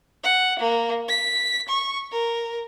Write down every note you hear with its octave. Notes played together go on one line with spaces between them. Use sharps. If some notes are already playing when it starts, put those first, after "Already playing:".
F#5
A#3
B6
C#6
A#4